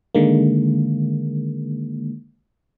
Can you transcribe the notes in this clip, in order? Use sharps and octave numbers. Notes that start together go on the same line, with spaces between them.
D3 D#3 G#3 A#3